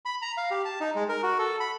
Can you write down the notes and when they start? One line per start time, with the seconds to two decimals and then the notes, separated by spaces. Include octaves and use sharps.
0.05 B5
0.22 A#5
0.37 F5
0.51 G4
0.65 A5
0.81 D#4
0.95 G#3
1.09 A#4
1.23 F#4
1.39 A4
1.60 B5